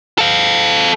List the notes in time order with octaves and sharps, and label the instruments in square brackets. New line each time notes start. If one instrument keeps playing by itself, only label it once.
[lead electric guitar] A4 F5